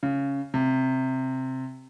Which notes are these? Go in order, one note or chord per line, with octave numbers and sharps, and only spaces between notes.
C#3
C3